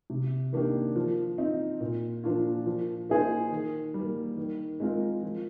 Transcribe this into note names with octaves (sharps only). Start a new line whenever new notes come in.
C3
D#3 A#3 D4 G4
F3
C4 D#4
A#2
F3 A#3 D4 F4
F3
A#3 D#4 G#4 C5
D#3
G3
A#3
D#3
G#3 C4 F4 A#4
F3